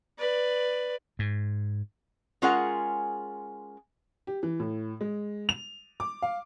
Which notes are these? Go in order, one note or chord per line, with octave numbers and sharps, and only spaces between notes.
B4 D5
G#2
G#3 C#4 F4 G#4 A#4 F#5
G4
E3
A2
G#3
F7
D6
F5